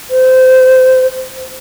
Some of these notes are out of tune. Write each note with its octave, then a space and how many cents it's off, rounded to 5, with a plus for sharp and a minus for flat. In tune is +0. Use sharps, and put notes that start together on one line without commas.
C5 -20